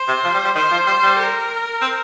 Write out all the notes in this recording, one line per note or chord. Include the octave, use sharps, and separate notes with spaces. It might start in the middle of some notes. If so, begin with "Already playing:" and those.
Already playing: C5
C3
F3
G3
G3
D#3 C5
F3
G3 C5
G3
A#4
C4